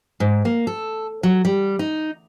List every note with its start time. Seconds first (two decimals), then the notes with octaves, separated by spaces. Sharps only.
0.20 G#2
0.45 A#3
0.67 A4
1.23 F#3
1.45 G3
1.79 D#4